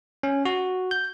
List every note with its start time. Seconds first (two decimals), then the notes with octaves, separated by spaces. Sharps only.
0.23 C#4
0.45 F#4
0.91 G6